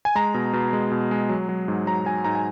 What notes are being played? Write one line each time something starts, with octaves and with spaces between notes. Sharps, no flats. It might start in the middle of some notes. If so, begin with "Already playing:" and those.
G#5
G#3 A#5
B2
B2
G#3
B2
G#3
F#3
F#3
G#2
F#3 A#5
F#3 G#5
G#2 A#5
G#5